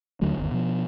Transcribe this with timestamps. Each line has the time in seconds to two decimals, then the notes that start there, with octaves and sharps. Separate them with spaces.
0.21 D#2 D3 F#3 A3
0.38 G1 D#2
0.51 B2 F3